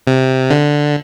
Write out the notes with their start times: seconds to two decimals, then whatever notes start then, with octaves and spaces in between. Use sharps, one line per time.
0.07 C3
0.50 D3